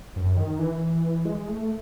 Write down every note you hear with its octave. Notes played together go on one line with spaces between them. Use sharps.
F#2
D#3
E3
G#3
A3